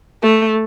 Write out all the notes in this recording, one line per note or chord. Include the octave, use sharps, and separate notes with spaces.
A3